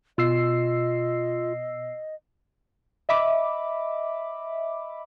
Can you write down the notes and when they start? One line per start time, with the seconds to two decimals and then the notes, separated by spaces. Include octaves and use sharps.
0.18 B2 F4 D#5 E6 C7
3.09 D#5 E5 B5 D6